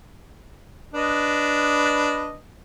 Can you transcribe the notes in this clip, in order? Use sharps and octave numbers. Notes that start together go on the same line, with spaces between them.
D4 B4 D#5